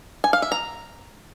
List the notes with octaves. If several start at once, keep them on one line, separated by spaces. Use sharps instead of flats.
G#5
F5
E5
A#5